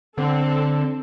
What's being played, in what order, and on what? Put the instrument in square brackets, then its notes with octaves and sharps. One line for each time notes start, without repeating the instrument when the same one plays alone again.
[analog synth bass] D3 [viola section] C4 A4